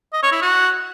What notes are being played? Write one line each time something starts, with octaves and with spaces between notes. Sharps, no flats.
D#5
C#5
E4
F#4